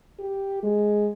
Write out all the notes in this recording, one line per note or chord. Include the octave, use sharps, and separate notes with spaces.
G4
G#3